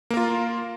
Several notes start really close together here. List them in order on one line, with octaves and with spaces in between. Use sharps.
A#3 A#4 F4